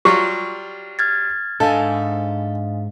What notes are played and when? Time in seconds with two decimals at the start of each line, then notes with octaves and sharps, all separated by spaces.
0.05 F#3 G3 F4 G4
0.99 F6 G#6 A6
1.60 G#2 D4 A4 D#5 F5 G#5